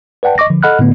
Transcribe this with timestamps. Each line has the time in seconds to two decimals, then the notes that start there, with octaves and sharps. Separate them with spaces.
0.23 B4 D5 F#5 G5 A5
0.38 D#5 C#6 D6 A#6
0.50 D3 F3
0.63 A4 D#5 F#5 B5 F6 F#6
0.79 A2 D3 A3 B3